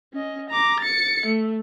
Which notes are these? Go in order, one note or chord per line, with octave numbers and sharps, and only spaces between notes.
C#4 D#5
A#5 D6
A6 C#7
A3